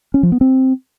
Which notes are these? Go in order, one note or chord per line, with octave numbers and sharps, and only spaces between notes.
C#4
F3
B3
C4